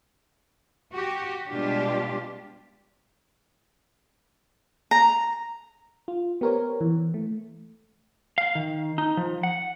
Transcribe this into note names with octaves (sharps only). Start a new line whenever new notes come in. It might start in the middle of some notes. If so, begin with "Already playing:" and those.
F#4 G4
B2 G3 G#3 D4 F4 G4
A#5
F4
B3 G4 A#4 C5 C#5
E3
A3
F5
D#3
D#4
F3
F#5